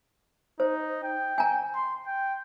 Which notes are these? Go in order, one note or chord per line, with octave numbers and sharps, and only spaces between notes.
D#4 C5
G5
G#5 A#5
C6
G5